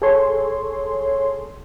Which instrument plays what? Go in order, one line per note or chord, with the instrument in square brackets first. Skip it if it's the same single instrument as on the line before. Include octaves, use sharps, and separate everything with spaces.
[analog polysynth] G#4 A4 C#5 C6